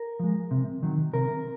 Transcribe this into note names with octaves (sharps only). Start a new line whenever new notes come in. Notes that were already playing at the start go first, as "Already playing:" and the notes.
Already playing: A#4
F3 G#3
C3
D#3 F#3
C3 A#4